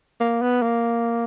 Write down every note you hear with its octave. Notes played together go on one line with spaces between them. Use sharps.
A#3
B3
A#3